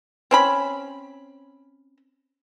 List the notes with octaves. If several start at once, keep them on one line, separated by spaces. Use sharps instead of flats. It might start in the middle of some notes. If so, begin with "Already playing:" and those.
C4 C#4 B5